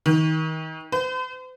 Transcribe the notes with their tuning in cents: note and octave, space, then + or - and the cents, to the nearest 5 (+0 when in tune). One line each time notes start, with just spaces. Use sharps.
D#3 +30
C5 -45